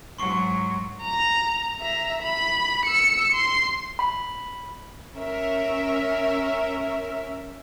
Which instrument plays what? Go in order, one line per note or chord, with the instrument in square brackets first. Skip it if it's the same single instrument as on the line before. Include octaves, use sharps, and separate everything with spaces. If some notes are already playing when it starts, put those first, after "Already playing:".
[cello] G#2 F#3 [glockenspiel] C6 C#6 C7
[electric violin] A#5
E5 A#5
B5
E6 C#7
C6
[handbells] B5
[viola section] C#4 A#4 E5